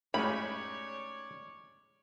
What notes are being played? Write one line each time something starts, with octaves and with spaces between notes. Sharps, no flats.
A2 G#3 C#4 D#4 G4 C#5 D5 B5